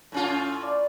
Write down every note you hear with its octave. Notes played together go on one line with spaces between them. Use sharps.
A2 C#4 F4
D5